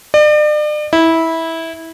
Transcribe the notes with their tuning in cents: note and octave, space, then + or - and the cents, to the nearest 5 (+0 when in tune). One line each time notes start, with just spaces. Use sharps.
D5 +40
E4 -15